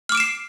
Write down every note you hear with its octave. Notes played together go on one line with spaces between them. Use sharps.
D6 F6 C7 D7 E7